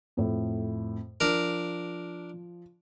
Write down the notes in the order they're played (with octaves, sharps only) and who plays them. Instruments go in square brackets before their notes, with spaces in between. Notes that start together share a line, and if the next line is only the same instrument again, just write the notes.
[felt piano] F2 A2
[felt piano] F3 [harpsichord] D4 A#4